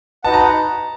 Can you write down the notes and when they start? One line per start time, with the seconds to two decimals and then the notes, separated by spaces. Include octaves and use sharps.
0.24 D#4 F#4 B4 D#5 F#5 A5
0.34 A#5